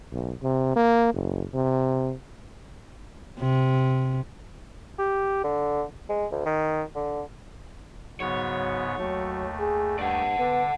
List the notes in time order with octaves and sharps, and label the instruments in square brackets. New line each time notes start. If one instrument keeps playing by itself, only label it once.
[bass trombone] B1
C3
A#3
F#1
C3
[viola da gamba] C3
[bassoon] G4
D3
G#3
D2
D#3
D3
[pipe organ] G#2 C#3 B3 [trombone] F#3 [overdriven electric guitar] C#5
[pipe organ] D#2 A3 [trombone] F#3
[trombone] G#4
[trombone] G2 [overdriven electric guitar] D5 F#5
[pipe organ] D3 [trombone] B3